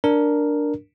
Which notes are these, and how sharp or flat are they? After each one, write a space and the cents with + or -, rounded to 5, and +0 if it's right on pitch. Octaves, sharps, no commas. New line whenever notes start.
D4 +0 A#4 +0